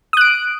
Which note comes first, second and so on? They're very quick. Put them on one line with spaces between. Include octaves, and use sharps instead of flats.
D#6 F#6 D7